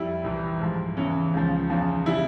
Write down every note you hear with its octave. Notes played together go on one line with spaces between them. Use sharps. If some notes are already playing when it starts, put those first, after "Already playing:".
Already playing: F2 G3 E4
C2 C3 E3 G3
G#2 F3
E2 C#3 E3 C#4
C#2 C#3 F3
E2 C#3 F3
C#3 G3 E4